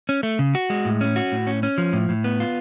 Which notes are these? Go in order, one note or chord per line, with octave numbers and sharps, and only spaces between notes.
C#4
A3
C#3
F#4
G#3
A2
C#4
F#4
A2
C#4
C#4
F3
A2
A2
B3
F4